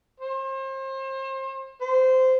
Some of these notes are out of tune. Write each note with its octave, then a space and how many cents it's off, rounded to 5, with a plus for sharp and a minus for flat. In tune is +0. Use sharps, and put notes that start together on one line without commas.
C5 +35
C5 -15